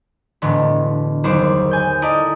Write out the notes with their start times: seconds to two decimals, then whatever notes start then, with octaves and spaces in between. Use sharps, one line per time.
0.42 E1 A2 D3
1.24 F#1 D#2 C5 D6
1.71 G#5 G6
2.02 E4 A4 A#4 D5 D#5